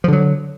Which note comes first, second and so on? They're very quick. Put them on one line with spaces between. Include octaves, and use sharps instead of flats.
F3 D3 F#3